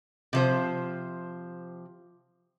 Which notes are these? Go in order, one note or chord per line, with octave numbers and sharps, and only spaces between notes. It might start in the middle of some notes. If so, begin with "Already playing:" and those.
C3 F3 C5